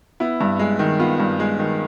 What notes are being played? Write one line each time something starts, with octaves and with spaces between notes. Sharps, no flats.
B3 E4
G2
G#3
D#3
B3 F4
G2
G#3
D#3